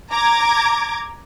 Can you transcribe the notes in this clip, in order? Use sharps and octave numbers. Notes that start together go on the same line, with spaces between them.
A#5 D6 G#6